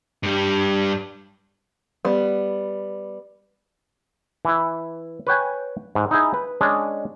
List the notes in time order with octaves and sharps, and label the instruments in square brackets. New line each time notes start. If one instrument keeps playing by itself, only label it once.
[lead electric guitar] G2 G3
[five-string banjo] G3 B3
[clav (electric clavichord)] E3 E4
B4 C#5 G5 G#5
G#2
D#4 E4 G#4
B4
G#3 C#4 D4